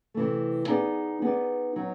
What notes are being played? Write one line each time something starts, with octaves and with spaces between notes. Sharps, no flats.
C3 E3 A3
B3 D#4 G#4 B4 D5
B3 D#4 G#4 B4 D5
F#3 B3 D#4